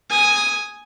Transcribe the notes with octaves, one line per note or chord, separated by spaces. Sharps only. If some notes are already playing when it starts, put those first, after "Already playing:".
G#5 D#6